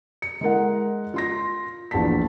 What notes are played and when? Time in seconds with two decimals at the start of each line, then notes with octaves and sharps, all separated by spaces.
0.22 C#7
0.41 G#3 E4 A#4 F#5
1.14 F4 C6 A#6
1.91 A#1 E2 D4 A5 B6